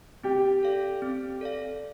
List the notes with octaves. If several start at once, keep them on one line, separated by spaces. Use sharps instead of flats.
C4 G4
A4 D5 F5
C4
A4 D5 F5